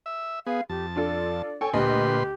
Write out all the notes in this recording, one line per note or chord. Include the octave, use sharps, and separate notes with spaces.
E5
B3 G#4 F5
F2 G4 A5
D4 F4 A4 D5
A4 C#5 G5 G#5
D2 A#2 G4 B4 D#5 C6